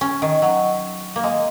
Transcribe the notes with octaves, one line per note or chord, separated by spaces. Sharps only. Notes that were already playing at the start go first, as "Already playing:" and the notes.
C#4
D#3
F#3
A#3
G#3